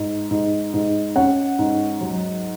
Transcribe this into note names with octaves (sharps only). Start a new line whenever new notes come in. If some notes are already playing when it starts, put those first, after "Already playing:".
Already playing: G#2
G#2
G#2
C#4 F#5
G#2
F#3